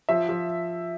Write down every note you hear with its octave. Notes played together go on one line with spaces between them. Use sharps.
F3 E5
F3